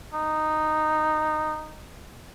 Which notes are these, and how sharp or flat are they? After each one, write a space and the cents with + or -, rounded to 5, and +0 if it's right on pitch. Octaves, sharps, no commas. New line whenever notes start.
D#4 -10